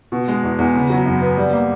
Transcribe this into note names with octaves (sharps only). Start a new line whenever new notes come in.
B2
G#3
E2
E2
C#3
F#3
F#2
B3
G3
A#3